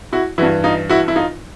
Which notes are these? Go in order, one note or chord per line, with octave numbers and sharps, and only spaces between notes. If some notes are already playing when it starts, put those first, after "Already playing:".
E4 F#4
G2 E3 E4 F#4
D#4 F4
E4 F#4
E4
D#4 F4